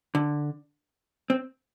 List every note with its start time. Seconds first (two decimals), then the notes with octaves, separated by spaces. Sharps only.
0.15 D3
1.30 C4